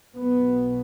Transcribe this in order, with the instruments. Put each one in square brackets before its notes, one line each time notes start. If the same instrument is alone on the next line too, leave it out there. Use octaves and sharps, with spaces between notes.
[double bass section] B1 B2 B3